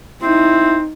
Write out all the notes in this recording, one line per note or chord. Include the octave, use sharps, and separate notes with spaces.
C4 D#4 E4